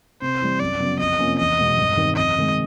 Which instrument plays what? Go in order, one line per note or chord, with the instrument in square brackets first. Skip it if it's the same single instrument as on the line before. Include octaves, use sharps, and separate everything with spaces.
[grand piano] C3 [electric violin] C5
[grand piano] E3 G3
[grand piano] F#2 [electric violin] D5
[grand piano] C#3 F#3 B3
[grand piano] F2 [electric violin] D#5
[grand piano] C3 F3 A#3 C#4
[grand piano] E2 [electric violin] D#5
[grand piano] B2 G#3 B3
G2
D#3 G3 C4 D#4
[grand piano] F2 [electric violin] D#5
[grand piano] C3 D#3 G#3